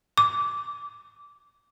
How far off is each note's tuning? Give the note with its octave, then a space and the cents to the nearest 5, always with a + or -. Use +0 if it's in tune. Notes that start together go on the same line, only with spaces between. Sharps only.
D6 -20